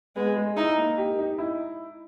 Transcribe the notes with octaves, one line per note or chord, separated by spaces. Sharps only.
G#3 B3
G#3
D#4 E4
A#3
G4
D#4
E4